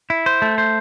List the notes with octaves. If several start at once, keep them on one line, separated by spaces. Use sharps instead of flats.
E4
C5
A3
C5